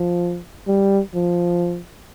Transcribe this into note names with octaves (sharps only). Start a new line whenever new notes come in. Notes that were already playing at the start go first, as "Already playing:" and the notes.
Already playing: F3
G3
F3